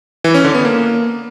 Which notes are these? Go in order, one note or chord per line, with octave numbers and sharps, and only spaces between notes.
E3
C#4
D3
B3
A#3